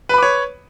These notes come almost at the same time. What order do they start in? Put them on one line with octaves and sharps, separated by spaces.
B4 B5 D6 C#5